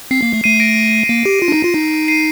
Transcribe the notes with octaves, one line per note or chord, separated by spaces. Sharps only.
C4 C7
A#3
A3
A3 C7 D#7
A#6 D7
A#3
G4
F4
D4
D#4
F4
D#4
C7 D#7